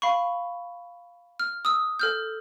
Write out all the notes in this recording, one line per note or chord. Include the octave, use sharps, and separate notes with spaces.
F5 B5 C#6
F6
D#6 E6
A4 F6 G6